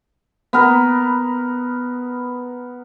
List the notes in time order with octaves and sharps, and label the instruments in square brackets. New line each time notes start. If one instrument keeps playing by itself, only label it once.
[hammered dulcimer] B3 A#4 B4